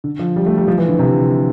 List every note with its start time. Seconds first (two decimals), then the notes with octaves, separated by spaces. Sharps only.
0.04 D3
0.19 F3
0.36 G3
0.46 A3
0.57 G3
0.68 F3
0.78 E3
0.88 D3
0.99 C3